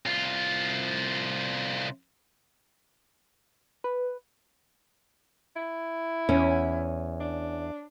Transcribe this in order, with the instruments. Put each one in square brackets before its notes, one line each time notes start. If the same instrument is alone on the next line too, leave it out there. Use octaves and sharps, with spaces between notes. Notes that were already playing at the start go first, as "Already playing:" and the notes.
[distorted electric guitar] C2 F4
[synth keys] B4
[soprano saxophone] E4
[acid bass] E2 [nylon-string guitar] C#4
[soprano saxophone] D4